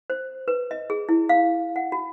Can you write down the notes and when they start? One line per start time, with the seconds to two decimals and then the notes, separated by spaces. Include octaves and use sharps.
0.10 C5
0.48 B4
0.71 D#5
0.90 G#4
1.09 E4
1.29 F5
1.76 F#5
1.92 F#4